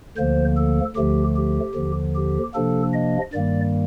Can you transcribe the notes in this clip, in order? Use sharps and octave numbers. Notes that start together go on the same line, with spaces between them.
D2 D3 F3 A#3 C5
A4
D2 D3 F3 A3 G4
G4
D#2 D3 F3
G4
C3 F3 A#3 D4 A4
D#5
G2 D#3 G3 A#3 D5